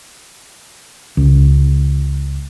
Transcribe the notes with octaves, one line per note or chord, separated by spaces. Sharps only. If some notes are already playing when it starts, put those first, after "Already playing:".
C#2